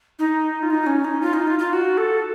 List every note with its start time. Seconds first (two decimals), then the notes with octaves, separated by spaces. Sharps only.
0.19 D#4
0.63 F4
0.70 D#4
0.86 C#4
1.05 D#4
1.22 F4
1.33 D#4
1.47 F4
1.59 F4
1.73 F#4
1.98 A4